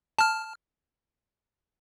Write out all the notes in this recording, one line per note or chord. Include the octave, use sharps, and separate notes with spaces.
A5 F6